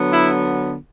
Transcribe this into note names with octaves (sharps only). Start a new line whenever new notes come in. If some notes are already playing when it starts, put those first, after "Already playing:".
Already playing: D3 F#3 B3
E4